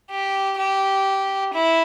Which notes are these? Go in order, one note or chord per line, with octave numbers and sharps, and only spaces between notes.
G4
G4
E4